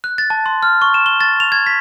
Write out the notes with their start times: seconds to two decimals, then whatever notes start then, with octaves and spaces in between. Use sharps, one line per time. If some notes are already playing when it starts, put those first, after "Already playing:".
0.04 F#6
0.18 A6
0.30 A5
0.46 C6
0.63 F6
0.82 C#6
0.94 E7
1.06 G7
1.21 A6
1.40 F7
1.52 G#6
1.67 B6